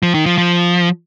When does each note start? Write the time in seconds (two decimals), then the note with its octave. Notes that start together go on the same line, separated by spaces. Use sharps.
0.03 F3
0.14 D#3
0.26 F3
0.38 F3